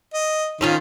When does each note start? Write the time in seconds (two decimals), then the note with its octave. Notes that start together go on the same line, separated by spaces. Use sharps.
0.14 D#5
0.61 D#3 C4 C#4 F4